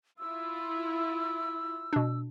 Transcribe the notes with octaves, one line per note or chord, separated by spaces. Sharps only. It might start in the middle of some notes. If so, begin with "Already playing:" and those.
E4 F4 E6
B2 D4